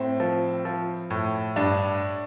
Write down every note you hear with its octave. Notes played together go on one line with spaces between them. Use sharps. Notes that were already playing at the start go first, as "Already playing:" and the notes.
Already playing: A2 C4
F3
F3
A2
G2 D4